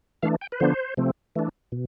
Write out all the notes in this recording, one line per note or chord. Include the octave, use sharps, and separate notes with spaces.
E3 A3 D4 F5
G5
B4
D3 F3 B3 D4 C5
C3 F3 A3 C4
E3 A3 D4
B2